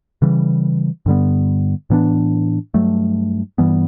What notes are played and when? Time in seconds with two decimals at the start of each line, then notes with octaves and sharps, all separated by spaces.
0.22 C#3 E3 G3
1.06 G2 D3 G3 B3
1.90 A2 E3 B3 D4
2.74 G2 F#3 A3
3.58 G2 E3 G3 B3